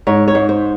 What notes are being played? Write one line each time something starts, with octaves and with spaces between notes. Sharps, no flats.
G#2 C#5
C#5
G#2
C5